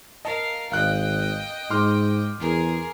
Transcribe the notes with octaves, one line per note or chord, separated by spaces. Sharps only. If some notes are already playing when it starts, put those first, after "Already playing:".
A#4 D#5 F5 A5
G#1 D#5 F5 G5 F#6
G#2 C6 D6 F6
E2 G#4 A#4